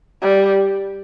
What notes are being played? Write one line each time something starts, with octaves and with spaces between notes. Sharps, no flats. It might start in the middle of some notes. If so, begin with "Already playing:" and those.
G3